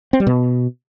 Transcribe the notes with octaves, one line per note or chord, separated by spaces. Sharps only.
C4
G3
B2